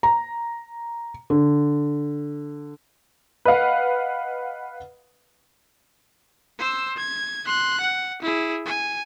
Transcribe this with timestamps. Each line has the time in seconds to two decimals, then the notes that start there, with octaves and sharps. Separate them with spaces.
0.03 A#5
1.30 D3
3.45 B4 D#5 F5 F#5
6.59 C5 E6
6.97 G#6
7.46 C6 F#6
7.80 F#5
8.22 E4 G#4
8.66 G#5